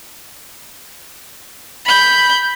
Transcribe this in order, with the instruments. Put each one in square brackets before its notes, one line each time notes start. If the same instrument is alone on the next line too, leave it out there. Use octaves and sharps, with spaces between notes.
[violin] B5 G6